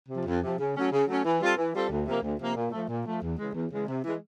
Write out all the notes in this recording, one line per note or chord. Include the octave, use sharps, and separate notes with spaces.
C3
F3
F2
C3 F3
C#3
F#3 A3 C#4
C#3
F#3 A3 C#4
E3
G3 C4 F4 A4
E3
G3 C4 F4 A4
D2
C3 F3 A#3
D2
C3 F3 A#3
A#2
F3 A3
A#2
F3 A3
E2
C#3 E3 G#3
E2
C#3 E3 G#3
C3
E3 G#3